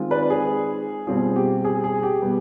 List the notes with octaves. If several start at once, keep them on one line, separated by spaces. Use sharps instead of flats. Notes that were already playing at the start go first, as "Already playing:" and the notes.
Already playing: D#3 G#3 C4 F4
B4 D5
G#4
B2 G3 C4 F4 G#4
G4
G#4
G#4
G4
B2 G3 B3